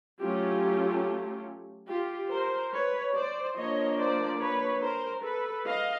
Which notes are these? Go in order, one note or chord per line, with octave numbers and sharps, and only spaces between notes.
F#3 A3 C#4 F4 G4
F4 G4
A#4 C5
B4 C#5
C5 D5
F3 A#3 D4 C#5 D#5
C5 D5
B4 C#5
A#4 C5
A4 B4
D#5 F5